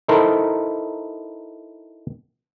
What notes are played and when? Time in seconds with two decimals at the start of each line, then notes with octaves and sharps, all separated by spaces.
0.08 D#4 E4 A4 A#4 C5